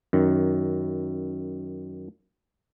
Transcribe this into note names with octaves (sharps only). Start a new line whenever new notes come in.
F#2 D#3